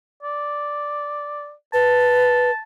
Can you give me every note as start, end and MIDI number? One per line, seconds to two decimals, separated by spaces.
0.23 1.53 74
1.73 2.51 71
1.73 2.62 81